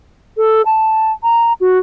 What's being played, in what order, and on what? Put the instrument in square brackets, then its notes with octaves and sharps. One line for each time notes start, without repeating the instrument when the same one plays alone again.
[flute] A4
A5
A#5
F#4